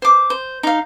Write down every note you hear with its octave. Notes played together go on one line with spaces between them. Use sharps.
C5 D6
C5
D#4 F5